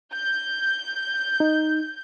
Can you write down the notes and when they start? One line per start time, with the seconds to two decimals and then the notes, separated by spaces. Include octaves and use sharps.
0.14 G6
1.40 D#4